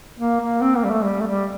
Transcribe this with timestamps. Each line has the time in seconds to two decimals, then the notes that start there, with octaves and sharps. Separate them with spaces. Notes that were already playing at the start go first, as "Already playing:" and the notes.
0.19 A#3
0.41 A#3
0.61 C4
0.77 A#3
0.84 G3
0.90 A3
1.05 G3
1.21 A3
1.26 G3